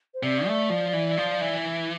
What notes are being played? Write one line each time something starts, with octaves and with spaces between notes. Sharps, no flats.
C5
C3 D5
A3
F3
E3
F3
E3